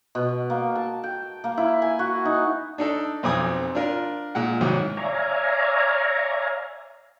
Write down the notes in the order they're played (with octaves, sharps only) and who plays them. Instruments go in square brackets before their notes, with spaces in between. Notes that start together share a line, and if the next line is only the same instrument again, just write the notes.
[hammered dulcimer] B2
A#3
A5
G5
A#3
E4
G#5
F#4
D#4
[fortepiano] D4 D#4 A4
B1 F2 C4 G#5 D6 D#6
D4 F4 A#4
A#2 G#3 F#5
C2 G#2 D#3 F#3
[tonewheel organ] C#5 D5 E5 F5 G#5 A#5